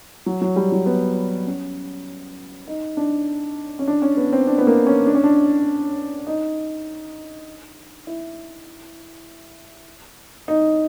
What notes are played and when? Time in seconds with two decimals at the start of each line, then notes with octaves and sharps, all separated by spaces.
0.26 F#3
0.41 F#3
0.56 G3
0.72 F#3
0.86 B3
1.47 C#4
2.67 D#4
2.97 D4
3.79 C#4
3.88 D4
4.02 C#4
4.17 B3
4.33 C4
4.47 D4
4.58 B3
4.67 A#3
4.87 C#4
5.07 D4
5.15 C#4
5.24 D4
6.27 D#4
8.07 E4
10.48 D#4